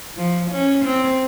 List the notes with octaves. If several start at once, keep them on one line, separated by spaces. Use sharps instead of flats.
F3
C#4
C4